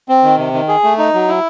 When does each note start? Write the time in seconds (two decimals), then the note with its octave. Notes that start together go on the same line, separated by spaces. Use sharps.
0.09 C4
0.23 D#3
0.38 C3
0.53 D#3
0.68 G#4
0.84 A3
0.98 D#4
1.14 F#3
1.28 E4